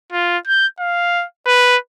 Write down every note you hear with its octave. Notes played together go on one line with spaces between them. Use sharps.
F4
G6
F5
B4